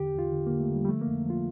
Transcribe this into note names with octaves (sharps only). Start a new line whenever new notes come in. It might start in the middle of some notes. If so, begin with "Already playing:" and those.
Already playing: E2 D3 G4
E2 F4
D3
D3 A#3
A3
D3 G3
G3
F3 A3
A#3
F2
F3 F4